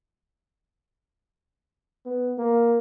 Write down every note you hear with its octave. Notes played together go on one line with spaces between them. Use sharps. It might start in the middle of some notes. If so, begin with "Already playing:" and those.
B3
A#3